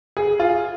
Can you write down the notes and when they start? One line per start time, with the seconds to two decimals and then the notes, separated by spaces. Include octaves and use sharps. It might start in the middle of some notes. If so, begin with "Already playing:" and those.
0.17 G#4
0.39 F4